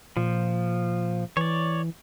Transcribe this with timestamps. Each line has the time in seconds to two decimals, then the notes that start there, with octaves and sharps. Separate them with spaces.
0.17 A#2 F3
1.37 E3 C#5 D5